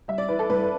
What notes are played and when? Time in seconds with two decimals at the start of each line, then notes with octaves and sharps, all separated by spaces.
0.08 G3 E5
0.18 D5
0.29 E3 B4
0.39 A4
0.49 G2 B4